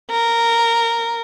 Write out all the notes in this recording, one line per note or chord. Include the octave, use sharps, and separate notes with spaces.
A#4